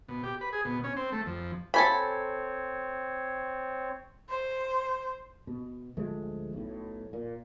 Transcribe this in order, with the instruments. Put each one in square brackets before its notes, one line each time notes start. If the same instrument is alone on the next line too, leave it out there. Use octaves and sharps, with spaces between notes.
[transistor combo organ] B2
G4
B4
G#4
B2
C#4
C4
A3
F2
[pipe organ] C4 C#5 [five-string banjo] A4 G#5 B5
[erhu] C5
[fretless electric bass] B2
D1 F3 G#3 A3
B1 A2
A#2